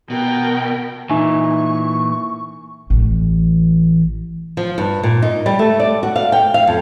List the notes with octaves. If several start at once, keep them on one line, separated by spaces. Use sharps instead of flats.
B2 A#4 G5
A#2 E3 D#4 E5 G#5 C#6
A1 E3
F3
G2
A#2
D#4
G3
A3
D5
F#4
F5
G5
F5
F2